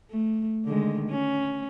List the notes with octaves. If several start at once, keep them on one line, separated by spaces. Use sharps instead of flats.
A3
D3 D#3 G#3
C#4